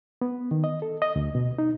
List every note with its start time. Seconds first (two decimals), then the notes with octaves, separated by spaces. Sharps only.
0.22 B3
0.51 D#3
0.64 D#5
0.82 A4
1.02 D#5
1.16 D2
1.35 B2
1.58 D#4